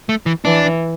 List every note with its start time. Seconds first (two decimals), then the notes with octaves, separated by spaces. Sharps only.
0.09 A3
0.26 E3
0.45 E3 D4